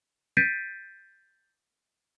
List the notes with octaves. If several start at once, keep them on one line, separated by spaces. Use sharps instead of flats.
G6 A6 B6 C7 D7 D#7